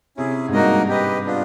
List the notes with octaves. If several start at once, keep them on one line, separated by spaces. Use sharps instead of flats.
C3 C#4 E4 G#4
G#2
G2 A#3 D#4 F#4 A#4 D#5
G4 B4 D#5
B3 D4 F4